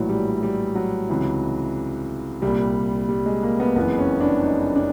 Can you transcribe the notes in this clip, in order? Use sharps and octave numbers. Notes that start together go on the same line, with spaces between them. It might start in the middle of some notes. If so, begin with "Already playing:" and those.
Already playing: A#1 A2 E3 F#3
G3
G3
F#3
C#2 C3 E3
C2 A#2 G3
G3
G#3
A#3
B3
F#1 F2 C#3 E3 B3
C#4
D4
D#4
D4